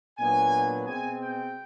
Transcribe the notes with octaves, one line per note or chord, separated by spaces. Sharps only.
A#2 F#3 B3 D4 G#5
B2 G#3 C4 G#5
G5